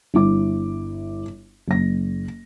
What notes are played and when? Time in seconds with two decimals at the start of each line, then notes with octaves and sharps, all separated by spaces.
0.14 G1 E4 D6
1.67 F#1 A#6